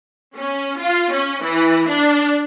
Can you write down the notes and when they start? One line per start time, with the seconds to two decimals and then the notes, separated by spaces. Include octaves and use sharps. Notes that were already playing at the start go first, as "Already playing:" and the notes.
0.36 C#4
0.79 F4
1.12 C#4
1.43 E3
1.88 D4